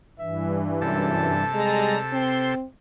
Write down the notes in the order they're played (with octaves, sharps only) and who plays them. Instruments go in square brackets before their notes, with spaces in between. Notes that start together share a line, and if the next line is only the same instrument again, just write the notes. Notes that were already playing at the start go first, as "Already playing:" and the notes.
[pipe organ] G2 E3 [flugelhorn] E5
[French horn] F#2 [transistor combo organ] C3 A4 [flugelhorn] A5
[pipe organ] G3 A#5 [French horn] G#3
[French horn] C4 [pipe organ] C6